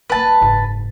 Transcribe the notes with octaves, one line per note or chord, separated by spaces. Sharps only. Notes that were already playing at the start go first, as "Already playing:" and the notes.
D#1 A#3 B4 A5
F#1 G#2